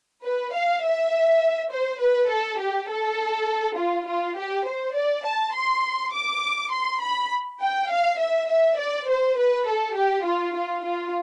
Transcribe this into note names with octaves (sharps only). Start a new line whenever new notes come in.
B4
F5
E5
C5
B4
A4
G4
A4
F4
F4
G4
C5
D5
A5
C6
D6
C6
B5
G5
F5
E5
E5
D5
C5
B4
A4
G4
F4
F4
F4